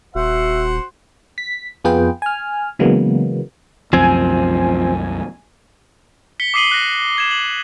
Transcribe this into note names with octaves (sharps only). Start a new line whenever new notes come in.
D#1 F#4 C5 E5 F#5
B6
F2 B3 F4 G#4 B4 G5
G#5 F6
C#3 E3 F#3 G#3 A#3 B3
C2 F#2 F3 C4 G#5
B6 C#7 G7
D6 D#6 C7 D#7 F#7 G7
F#6 A#6
G#6 E7
F#7